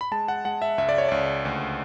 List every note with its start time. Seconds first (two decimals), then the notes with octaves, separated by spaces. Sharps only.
0.01 B5
0.11 G#3 A5
0.28 F#5
0.45 G#3 F#5
0.62 E5
0.78 C#2 E5
0.89 D5
0.98 C#5
1.09 C#2 D5
1.45 D2